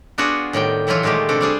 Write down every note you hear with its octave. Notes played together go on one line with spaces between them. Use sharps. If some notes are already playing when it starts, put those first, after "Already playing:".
B3 D4 F4 F#4 G#4
A2 D#3 G3 G5
B2 E3 F#3 E4 F4
A#2 D#3 G#3 A3 G4
C3 D4 A4
G3 D4 G#4 C5